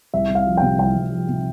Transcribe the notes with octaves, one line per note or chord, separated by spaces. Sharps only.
C2 E5
C2 F5
F3
C3 G5
C2 G5
C2
F3
C3